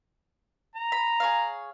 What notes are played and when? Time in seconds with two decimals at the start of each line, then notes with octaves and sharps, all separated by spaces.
0.75 A#5
0.92 B5
1.20 G#4 C#5 F5